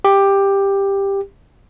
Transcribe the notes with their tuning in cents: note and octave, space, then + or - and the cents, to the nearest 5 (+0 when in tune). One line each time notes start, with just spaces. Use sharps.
G4 +10